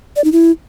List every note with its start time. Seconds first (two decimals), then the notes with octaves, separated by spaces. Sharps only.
0.16 D5
0.24 D#4
0.32 E4